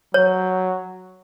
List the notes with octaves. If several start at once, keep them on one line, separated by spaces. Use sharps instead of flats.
F#3 C#5